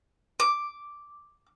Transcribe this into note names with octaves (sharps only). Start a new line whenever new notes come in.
D6